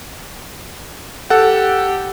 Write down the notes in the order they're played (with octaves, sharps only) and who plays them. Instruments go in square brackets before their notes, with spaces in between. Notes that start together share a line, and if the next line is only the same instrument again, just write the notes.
[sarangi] G4 [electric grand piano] A4 F#5